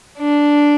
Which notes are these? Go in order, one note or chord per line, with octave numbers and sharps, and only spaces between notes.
D4